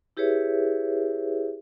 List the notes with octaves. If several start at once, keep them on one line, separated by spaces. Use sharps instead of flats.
E4 G4 G#4 B4 C#5 E5